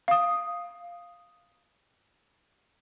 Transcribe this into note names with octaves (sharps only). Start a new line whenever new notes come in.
F5 D#6